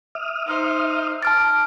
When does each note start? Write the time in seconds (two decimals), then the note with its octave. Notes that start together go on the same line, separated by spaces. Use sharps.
0.15 E5 D#6 F6
0.47 D#4 C5
1.22 A5 D6 F6 A6